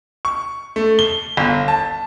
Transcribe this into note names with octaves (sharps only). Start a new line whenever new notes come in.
C#6
A3
G7
G1
A5